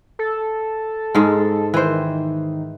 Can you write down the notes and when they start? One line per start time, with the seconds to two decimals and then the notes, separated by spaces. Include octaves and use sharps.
0.19 A4
1.15 G#2 G#3
1.74 D#3 E3 C5